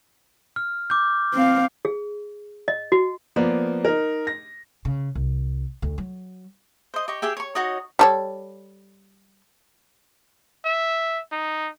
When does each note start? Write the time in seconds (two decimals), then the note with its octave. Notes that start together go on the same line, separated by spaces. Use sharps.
0.56 F6
0.90 D6 G6
1.34 C4 F5
1.85 G#4
2.68 D#5
2.92 F#4
3.36 F3 A#3 B3 D5
3.85 D#4 A#4
4.27 A#6
4.85 C#3
5.15 C2
5.82 D2
5.98 F#3
6.94 C5 D#5
7.08 G4 D#5 C#6
7.22 G4 G#4 E5 G5
7.37 C#5 C#6
7.55 D#4 F#4 C#5 D#5
7.99 G3 A4 C#5
10.65 E5
11.32 D#4